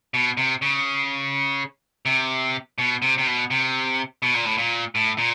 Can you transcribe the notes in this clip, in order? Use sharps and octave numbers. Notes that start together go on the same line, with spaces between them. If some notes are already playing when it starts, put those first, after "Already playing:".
B2
C3
C#3
C3
B2
C3
C3
B2
C3
B2
A#2
A2
A#2
A2
A#2